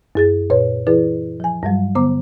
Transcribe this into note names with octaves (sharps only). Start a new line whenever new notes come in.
F#2 G#4 A6
A#2 B4 C#5
E3 E4 G#4 B4 D5
F3 G#5
G2 F#3 G3
D3 B3 C5 A#5 D6